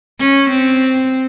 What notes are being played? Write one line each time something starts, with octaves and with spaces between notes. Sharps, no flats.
C#4
C4